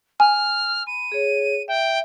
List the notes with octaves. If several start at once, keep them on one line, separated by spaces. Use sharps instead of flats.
G#5 F6
B5 D#7
G#4 C#5
E5 G5